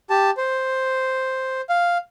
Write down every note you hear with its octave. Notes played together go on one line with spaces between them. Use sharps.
G4 A5
C5
F5